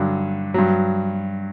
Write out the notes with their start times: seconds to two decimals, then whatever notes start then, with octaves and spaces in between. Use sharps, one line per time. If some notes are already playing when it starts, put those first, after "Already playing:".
Already playing: G2 D3 F#3
0.54 G2 F#3